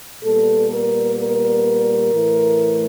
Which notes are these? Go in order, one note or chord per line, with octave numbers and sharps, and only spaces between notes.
A#2 G3 B3 A4
A#4
A#4
A2 E3 A3